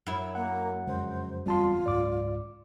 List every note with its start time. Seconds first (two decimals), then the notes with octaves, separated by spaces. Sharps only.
0.07 F#2 E4
0.35 A#3 F#5
0.87 F2 C#3 G#3 C5
1.46 F#1 E2 G3 C4 F4 A5 C6
1.86 C#2 G#2 D5 D6